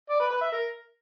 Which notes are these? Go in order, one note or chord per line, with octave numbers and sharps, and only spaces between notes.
D5
B4
B4
E5
A#4